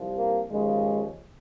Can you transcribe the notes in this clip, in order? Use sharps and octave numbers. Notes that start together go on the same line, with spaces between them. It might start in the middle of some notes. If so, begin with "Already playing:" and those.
Already playing: C2 C3 F3
A#3
D#2 C#3 F3 G#3